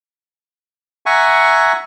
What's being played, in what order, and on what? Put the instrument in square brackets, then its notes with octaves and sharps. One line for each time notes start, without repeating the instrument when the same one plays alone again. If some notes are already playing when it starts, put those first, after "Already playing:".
[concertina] E5 F#5 G#5 A#5 C#6